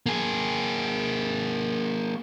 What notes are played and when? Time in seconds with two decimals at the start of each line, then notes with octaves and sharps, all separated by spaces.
0.06 A#3 G#4